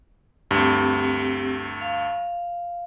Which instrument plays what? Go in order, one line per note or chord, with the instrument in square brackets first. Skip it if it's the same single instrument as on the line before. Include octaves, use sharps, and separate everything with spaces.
[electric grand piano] D2 G2 [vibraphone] C4 G4
[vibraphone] F5